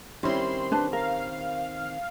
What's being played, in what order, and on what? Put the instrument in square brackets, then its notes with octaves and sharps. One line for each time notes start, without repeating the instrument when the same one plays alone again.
[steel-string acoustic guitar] D#3 C4 [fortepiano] G3 C#4 E4 [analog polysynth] C6
[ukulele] D4 B4 A5
[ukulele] A#4 [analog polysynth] F5